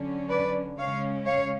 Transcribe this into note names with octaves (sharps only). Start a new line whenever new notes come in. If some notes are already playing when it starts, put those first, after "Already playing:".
Already playing: D3 F#3 C#4
B4 D5
C#3 G#3 C#4 C#5 F5
C#5 F5